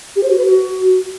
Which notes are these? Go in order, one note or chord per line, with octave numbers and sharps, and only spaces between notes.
G4
C5
F#4
B4
F#4